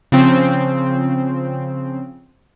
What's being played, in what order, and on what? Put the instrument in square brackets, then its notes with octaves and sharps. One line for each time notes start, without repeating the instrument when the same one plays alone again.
[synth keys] C#3 F3 C4